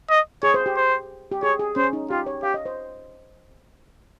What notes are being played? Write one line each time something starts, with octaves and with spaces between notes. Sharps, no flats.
D#5
G#4 C#5
C5
G4
C5
G4
G#4 C#5
G#4
C#4 C5
D#4
F4 G4
C#5
G4 F5
D#5
C5